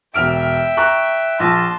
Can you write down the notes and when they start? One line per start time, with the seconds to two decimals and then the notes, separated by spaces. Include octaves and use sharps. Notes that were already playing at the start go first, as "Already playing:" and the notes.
0.14 E1 E5 G5 F6 D7
0.77 A#5 C#6 F#6
1.40 A#1 A5 C6